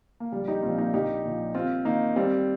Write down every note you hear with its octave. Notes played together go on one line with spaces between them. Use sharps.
A#3
A#1 G3
D#4 G4
A#2 F3 C4 F4
A#3 D#4
A#1 D#4 G4
A#2 F3
D#2 C4 F4
D#3 A#3 D#4
D#2 G3 C4